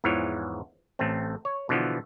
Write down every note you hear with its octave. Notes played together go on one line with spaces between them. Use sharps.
E2 G#2 E3 F3 C#5
A1 A3 C4
C#5
B2 D3 E3 F3 B3